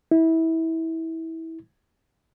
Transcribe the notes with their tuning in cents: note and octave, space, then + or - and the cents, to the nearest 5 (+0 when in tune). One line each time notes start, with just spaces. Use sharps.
E4 -25